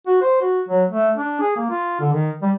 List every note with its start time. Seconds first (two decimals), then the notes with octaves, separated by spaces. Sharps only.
0.07 F#4
0.22 C5
0.42 F#4
0.69 F#3
0.91 A3
1.17 D4
1.41 G#4
1.57 A#3
1.71 F4
2.01 D3
2.13 D#3
2.42 G3